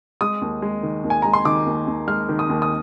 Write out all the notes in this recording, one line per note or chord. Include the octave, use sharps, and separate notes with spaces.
G#3 D#6
D#2
G#3
D#3
D#2
G#5
G#3 A#5
C6
D#3 D6
D#2
D#2
G#3 F6
D#3
D#6
D#2
D#6